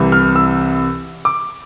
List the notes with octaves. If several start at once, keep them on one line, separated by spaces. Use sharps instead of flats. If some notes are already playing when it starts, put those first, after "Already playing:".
Already playing: C2 C3 E3
F6
E6
D6